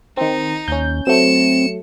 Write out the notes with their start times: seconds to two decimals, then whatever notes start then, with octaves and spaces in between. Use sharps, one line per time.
0.17 D#3 C4 D#4
0.68 D#2 C#4 G6
1.07 F#3 A3 C4 C#7 E7